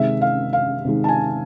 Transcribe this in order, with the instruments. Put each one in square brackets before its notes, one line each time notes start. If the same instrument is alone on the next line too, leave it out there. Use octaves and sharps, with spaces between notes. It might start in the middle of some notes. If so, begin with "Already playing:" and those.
Already playing: [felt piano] C3 D#3 G#3 E5
F5
F5
C3 D#3 G#3
A5
G#5